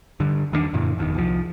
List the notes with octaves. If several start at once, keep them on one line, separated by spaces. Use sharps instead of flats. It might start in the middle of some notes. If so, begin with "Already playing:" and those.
G2 D3
E2 D#3 A#3 D4
F#2 A#2 D3 E3
F1 E2 D#3
C2 F3